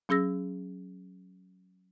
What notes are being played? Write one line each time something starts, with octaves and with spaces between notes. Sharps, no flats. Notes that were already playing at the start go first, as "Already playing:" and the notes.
F#3 C#4 G#4 E6 A#6